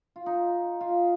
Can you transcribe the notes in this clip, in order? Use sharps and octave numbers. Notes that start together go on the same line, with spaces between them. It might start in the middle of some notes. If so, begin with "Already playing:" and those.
F4
D#4
F4